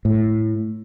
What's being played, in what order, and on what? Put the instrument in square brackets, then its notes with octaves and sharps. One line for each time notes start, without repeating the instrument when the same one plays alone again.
[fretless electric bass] A2